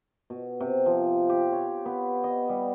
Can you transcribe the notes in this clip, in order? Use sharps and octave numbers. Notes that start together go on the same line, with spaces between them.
B2
C3
F3
G4
C#5
B3
D#5
G3